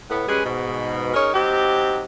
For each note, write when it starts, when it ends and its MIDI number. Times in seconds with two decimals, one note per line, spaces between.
0.10 0.26 45
0.10 0.26 59
0.28 0.42 55
0.28 0.42 56
0.28 0.42 61
0.28 0.42 68
0.28 0.42 71
0.45 1.11 44
0.45 1.11 47
1.14 1.30 61
1.14 1.30 63
1.14 1.30 68
1.14 1.30 70
1.14 1.30 73
1.34 2.04 54
1.34 2.04 60
1.34 2.04 63
1.34 2.04 67